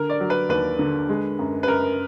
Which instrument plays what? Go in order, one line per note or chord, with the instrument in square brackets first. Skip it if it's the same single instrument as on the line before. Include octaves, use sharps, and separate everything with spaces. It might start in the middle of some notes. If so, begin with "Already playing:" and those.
Already playing: [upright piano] D3 A#4
D5
F#3
B4
D#2 B4
D3
G#3
F#2
B4
F#2 A#4